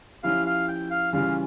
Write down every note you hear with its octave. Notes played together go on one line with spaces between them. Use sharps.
F3 C#4 E4 G4 F5
F5
G5
F5
C#3 E3 G3 C#4 F4 F5